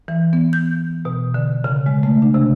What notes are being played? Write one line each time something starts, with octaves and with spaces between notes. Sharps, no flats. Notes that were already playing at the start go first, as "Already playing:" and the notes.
E3
B3
G6
B2
D3
C#3
G#3
A3
D4
C3